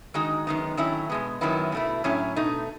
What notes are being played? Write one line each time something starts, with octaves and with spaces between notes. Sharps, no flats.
D#3 G#3 D#4 F#4
F#2 D#3 G#3 B3 D#4
D#3 F#3 A3 C#4 E4
B2 G#3 B3
F#2 D#3 F#3 B3 E4
B2 A3 E4
A2 F#3 C#4 E4
B2 A3 D#4